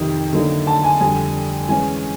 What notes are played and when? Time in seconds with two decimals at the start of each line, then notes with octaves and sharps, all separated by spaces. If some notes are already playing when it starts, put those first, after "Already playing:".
Already playing: F2 C3 D#3
0.33 D3 F#3 A#3 D#4
0.67 A5
0.84 G#5
1.00 F2 D3 G3 G#5
1.69 E3 G#3 C#4 G#5